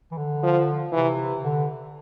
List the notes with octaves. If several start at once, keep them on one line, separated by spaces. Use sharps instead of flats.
E3
D3
F3
C3 E3
D3